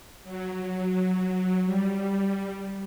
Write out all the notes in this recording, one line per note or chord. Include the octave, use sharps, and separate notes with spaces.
F#3
G3